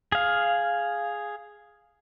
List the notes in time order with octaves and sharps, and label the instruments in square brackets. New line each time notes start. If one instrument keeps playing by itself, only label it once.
[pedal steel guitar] G#4 F5